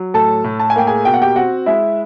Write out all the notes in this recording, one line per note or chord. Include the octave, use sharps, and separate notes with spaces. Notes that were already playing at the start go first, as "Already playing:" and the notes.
Already playing: F#3
A2 A4 A5
A2
A5
G#5
A#3 G5
G#4 G#5
B2 G5
F#5
G4 G5
C4 F#4 F#5
G#3 E4 E5